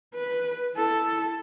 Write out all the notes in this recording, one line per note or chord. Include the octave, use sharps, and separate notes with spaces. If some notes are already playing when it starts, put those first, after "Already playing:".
B4
E4 A4